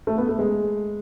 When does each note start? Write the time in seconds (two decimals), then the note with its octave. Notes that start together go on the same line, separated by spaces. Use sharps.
0.07 A3
0.18 B3
0.29 A3
0.39 G#3